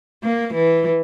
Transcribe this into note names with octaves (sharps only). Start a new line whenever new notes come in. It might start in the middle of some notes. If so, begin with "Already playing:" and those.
A#3
E3